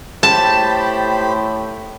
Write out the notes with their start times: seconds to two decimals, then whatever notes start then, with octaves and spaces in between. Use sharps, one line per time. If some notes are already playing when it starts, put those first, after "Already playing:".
0.23 A2 G4 C5 A5 B5